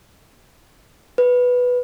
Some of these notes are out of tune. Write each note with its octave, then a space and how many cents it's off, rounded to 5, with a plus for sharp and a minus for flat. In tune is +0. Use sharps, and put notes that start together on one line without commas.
B4 +0